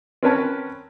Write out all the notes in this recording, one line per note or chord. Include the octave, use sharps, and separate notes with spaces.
C4 C#4 A#4 B4 C#5 A5